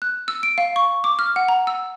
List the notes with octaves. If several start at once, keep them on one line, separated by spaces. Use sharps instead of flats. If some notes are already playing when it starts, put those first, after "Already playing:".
F#6
E6
D7
F5
C#6
D6
F6
F#5
A#5
E6